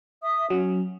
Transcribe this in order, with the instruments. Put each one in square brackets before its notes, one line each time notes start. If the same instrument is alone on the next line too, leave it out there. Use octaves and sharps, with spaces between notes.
[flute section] E5 D#6
[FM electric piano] F#3 [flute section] C#4